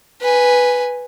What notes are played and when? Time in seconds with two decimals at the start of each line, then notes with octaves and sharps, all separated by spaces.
0.21 B4 G#5